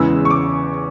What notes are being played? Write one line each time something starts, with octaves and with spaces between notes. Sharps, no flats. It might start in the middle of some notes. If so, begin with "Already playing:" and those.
Already playing: E2 C#3 E3 G#3 E6
C#6
D6